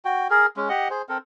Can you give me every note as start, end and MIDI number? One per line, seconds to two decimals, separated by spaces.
0.05 0.27 66
0.05 0.27 79
0.30 0.46 68
0.30 0.46 70
0.57 0.69 56
0.57 0.69 61
0.69 0.88 67
0.69 0.88 75
0.69 0.88 78
0.90 1.02 68
0.90 1.02 72
1.09 1.18 60
1.09 1.18 69
1.09 1.18 70